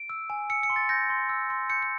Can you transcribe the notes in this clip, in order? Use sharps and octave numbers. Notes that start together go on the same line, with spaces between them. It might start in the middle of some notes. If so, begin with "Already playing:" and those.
Already playing: D7
E6
G#5
E6 C#7
C#7
C6
A6
G6 A#6
C6
E6
C6
G6 C#7
C#7